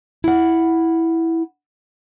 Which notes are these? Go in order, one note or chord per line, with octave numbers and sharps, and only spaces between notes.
E4 F#5